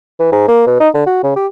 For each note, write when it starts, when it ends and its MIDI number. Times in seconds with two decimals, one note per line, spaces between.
0.20 0.28 52
0.32 0.46 44
0.48 0.63 58
0.67 0.75 47
0.80 0.89 63
0.94 1.04 50
1.06 1.20 66
1.23 1.34 49
1.36 1.47 67